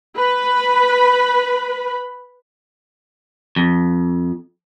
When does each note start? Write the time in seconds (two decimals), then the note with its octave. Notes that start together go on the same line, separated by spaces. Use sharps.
0.16 B4 B5
3.56 F2